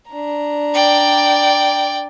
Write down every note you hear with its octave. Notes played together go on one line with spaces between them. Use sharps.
D4 A#5
D5 G5